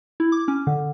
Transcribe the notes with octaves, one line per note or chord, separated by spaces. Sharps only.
E4
D6
C#4
D3